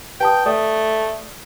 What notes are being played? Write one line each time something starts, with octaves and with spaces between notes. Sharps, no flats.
B4 G5 A5 D#6
A3 D5 D#6